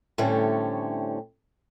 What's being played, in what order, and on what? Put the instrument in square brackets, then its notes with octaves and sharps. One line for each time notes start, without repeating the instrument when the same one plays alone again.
[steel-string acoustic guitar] A2 D3 G3 A3 C4 C#4